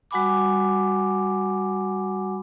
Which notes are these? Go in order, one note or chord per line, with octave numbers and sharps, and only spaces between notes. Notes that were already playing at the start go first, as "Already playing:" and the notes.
G3 F#4 F#5 G#5 B5 D6